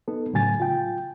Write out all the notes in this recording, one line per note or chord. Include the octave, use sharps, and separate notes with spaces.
B3 D#4 A4
A2 C#3 F#3 G#5 A6
F4 G5